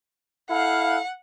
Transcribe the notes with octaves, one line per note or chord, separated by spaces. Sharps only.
E4 A4 F5 F#5